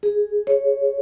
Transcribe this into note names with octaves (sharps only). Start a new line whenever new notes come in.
G#4
C#5